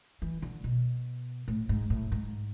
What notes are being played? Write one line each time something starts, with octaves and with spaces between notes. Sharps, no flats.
E3
D3
B2
A2
G#2
A2
G#2